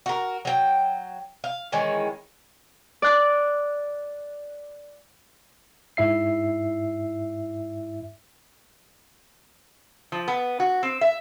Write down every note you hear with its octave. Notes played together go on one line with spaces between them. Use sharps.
F#4 A#4
F#3 G5
F5
D#3 E3 G#3 C#4
D5 F#6
G#2 E4 E5 C7
F3
B3
F#4
C4
E5